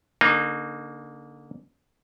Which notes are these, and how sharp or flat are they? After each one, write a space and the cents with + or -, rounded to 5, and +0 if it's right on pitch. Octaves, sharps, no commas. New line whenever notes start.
D3 -35 A#3 +0 D#4 -30